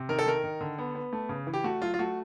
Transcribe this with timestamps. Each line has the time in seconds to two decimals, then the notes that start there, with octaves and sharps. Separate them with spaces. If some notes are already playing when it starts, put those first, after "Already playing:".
Already playing: C3
0.09 D#3 A#4
0.19 A4
0.26 D#3 A#4
0.44 D#3
0.61 D3
0.78 B3
0.95 B3
1.13 A3
1.29 C#3
1.47 E3
1.54 G4
1.64 A3 F#4
1.81 F#3 F4
1.94 F4
1.99 A3 F#4